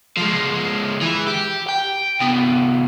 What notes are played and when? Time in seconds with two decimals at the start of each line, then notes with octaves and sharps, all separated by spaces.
0.17 F3 G#3
1.01 E3 E4
1.27 G4
1.69 G5
2.20 C2 B3